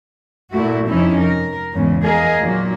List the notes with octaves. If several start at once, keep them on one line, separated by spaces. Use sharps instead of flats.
A#2 A3 E4 F#4
F2 C3 C#4 D#4 E4
A#4
E2 G#2 C#3
G#4 A#4 D#5 F5
A#2 D#3 F#3 A#3